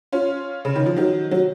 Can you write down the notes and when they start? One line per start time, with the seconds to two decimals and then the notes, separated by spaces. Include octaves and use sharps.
0.12 C#4 F4
0.65 C#3
0.76 D#3
0.86 F3
0.96 D#3 F#3
1.31 F#3